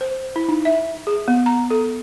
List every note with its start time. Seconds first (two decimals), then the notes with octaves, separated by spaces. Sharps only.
0.01 C5
0.36 E4
0.48 D#4
0.65 E5
1.07 G#4
1.28 B3
1.46 A#5
1.71 A4